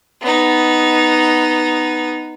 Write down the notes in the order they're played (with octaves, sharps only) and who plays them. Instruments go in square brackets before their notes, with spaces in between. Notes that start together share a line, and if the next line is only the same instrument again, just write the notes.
[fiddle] B3 D#4